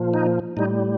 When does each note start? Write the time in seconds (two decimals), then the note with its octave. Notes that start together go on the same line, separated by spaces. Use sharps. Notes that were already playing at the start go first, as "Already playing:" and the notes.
Already playing: A#2 F3
0.14 D#4
0.57 A2 G3 D#4